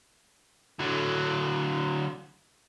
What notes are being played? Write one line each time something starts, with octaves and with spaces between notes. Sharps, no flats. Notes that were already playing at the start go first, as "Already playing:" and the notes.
D3 F#3